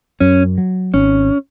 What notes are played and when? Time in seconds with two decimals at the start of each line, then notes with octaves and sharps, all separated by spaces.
0.20 F#2 C#4
0.58 F#3
0.94 G#1 C#4